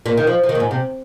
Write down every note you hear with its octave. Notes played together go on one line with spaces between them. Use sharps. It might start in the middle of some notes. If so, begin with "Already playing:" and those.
A#2
D#3
F3
F3
D#3
A#2
G#2
C3